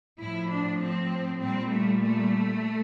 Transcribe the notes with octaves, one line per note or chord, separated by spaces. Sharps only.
A2 F3 E4
D4
C4
A#2 G3 C4
A3
A3